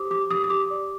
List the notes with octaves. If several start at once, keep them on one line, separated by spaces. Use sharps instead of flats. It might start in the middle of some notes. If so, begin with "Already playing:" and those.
Already playing: G4 C5 D6 D#6
G4 D6
G4 D#6
D#6
G4 D6
D5